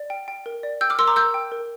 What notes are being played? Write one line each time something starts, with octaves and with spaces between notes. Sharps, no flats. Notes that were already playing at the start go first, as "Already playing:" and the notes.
Already playing: D5
G5
G5
A#4
D5
G5 E6 G6
D6 F6
A#4 C6 E6
A#5 D6
A#4 E6 G6
G5
A#4